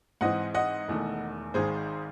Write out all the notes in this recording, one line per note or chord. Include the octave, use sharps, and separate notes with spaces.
G#2 E3 C4 D#5 F#5
D#5 F#5
E1 E2 D#3 A3
G#1 G#2 D#3 G#4 C5